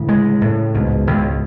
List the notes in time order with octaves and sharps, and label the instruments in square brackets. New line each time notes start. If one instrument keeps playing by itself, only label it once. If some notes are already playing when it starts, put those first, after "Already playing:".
Already playing: [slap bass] D2 [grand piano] A2 C#3
[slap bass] G#3
A2
[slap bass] C#2 [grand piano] G#2 B2
[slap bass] C#2